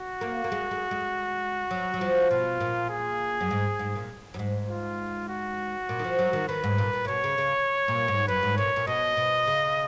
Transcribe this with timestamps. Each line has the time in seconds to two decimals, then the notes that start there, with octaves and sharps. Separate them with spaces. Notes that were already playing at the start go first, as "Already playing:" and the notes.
Already playing: F#4
0.21 A#3
0.44 A#3
0.52 G#3
0.71 G#3
0.91 G#3
1.71 F#3
1.94 F#3
2.01 F3
2.30 B2 F4
2.60 A#2
2.90 G#4
3.41 F#2
3.51 G#2
3.79 G#2
3.95 A#2
4.34 F#2
4.39 G#2
4.69 F4
5.29 F#4
5.89 A#2
5.99 D#3
6.04 F3
6.19 F#3
6.33 D#3
6.49 D#3 B4
6.64 G#2
6.78 A#2
6.93 A#2
7.05 A#2
7.08 B2 C#5
7.24 C#3
7.38 C#3
7.88 A#2
8.08 G#2
8.28 F#2 B4
8.43 G#2
8.57 A#2 C#5
8.76 A#2
8.87 B2 D#5
9.17 B2
9.47 C#3